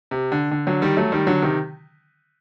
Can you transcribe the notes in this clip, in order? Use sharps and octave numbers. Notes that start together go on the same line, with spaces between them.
C3
D3
D3
D3 F#3
D#3 G3
F#3 A3
D#3 G3
D3 F#3
C3 D#3